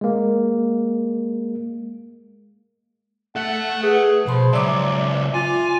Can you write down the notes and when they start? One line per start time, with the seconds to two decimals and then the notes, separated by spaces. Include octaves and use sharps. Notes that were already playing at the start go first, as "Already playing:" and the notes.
0.01 G#3 A#3
3.36 A4 E5 F#5
3.83 G#4 B4
4.26 B2 F3 C5 B5 C6
4.53 C#2 F#3 D5 E5 D6
5.34 F4 G#5